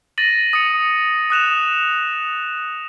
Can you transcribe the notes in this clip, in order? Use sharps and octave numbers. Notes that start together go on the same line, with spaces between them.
A6 A#6 D#7 F#7
D#6 C#7
D#6 F#6 E7 F7